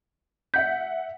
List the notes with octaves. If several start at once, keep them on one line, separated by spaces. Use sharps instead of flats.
E5 F#5 G6 B6